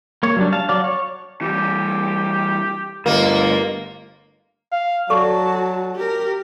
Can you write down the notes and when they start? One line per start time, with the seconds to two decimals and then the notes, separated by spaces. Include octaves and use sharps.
0.23 A#3 C#5
0.36 F#3 G3 D4
0.52 F5 A5
0.69 F#3 D5 F5
0.84 C#5
1.41 E3 G3 G4
3.06 G1 A2 A#3 D#5
4.72 F5
5.10 F#3 F#4 A4 D5 A5 C#6
5.96 G4 A#4